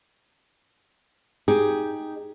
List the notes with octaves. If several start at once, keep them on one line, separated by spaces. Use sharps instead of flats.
D#4 G4 G#4